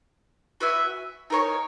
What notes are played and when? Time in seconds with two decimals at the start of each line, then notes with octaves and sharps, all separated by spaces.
0.60 F#4 B4 E5 G#5
1.30 D#4 A#4 C#5 G#5